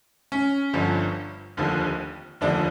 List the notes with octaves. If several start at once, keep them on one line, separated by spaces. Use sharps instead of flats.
C#4
G1 G2 D3 F3
F1 D#2 D3 F3
F1 D#2 D3 F3 D4